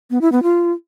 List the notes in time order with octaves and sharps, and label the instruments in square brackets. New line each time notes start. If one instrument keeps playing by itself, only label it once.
[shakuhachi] B3
E4
B3
F4